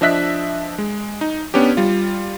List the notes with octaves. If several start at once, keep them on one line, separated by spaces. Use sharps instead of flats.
F3 D4 D#5 E5 F#6 B6
G#3
D#4
B3 C#4 D4 G4
G3 F4